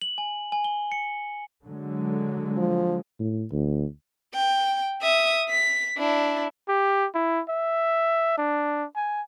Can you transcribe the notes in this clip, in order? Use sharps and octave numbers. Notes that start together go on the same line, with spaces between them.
F#7
G#5
G#5
G7
C#7
D3 F#3 G#3
F3
A2
D2
G5
E5 D#6
B6
D4 E4
G4
E4
E5
D4
G#5